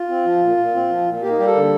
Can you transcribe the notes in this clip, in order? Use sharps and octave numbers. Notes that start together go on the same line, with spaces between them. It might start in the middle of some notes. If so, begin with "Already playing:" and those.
Already playing: F4
C4
F3
A#2
A#2
C4
F3
A#2
A#3 G4
D#4
G3 G4
A4
D3